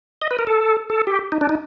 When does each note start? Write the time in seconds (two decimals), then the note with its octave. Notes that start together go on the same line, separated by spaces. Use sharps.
0.22 D#5
0.31 B4
0.39 A#4
0.47 A4
0.90 A4
1.07 G4
1.32 D#4
1.41 D4
1.49 D#4